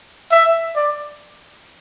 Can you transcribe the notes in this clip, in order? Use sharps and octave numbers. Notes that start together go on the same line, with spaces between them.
E5
D5